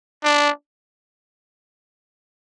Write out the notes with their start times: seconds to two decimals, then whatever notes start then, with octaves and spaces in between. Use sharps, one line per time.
0.24 D4